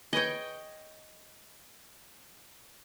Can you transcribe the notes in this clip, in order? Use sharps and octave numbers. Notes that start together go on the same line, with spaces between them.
G#4 B4 C#5 D#5 G5